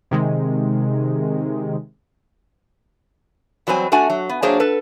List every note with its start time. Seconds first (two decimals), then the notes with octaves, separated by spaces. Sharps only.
0.11 C3 D#3 G#3
3.67 E2 F#3 G3 C4 G#5
3.92 A3 D4 F#4 F#5 G#5
4.10 F#3
4.29 B3
4.42 F#3 A#3 D4 G#4 C5 C#5
4.60 A4 B4